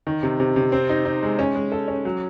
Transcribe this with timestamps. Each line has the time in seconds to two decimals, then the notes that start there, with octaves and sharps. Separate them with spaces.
0.07 D#3
0.23 C3
0.40 C3
0.56 C3
0.72 C4
0.89 D#4
1.05 D#4
1.23 G#3
1.39 C#4
1.56 G#3
1.72 A4
1.88 C#4
2.05 F#3